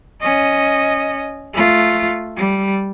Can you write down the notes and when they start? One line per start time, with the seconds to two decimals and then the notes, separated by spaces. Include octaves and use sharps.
0.20 C#4 D#5
1.54 A3 F4
2.36 G3